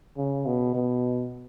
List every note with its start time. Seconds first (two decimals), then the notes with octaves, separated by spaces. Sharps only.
0.17 C#3
0.46 B2
0.74 B2